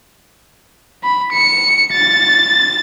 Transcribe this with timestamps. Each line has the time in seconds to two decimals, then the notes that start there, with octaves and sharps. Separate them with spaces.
1.04 B5
1.32 C#7
1.93 A6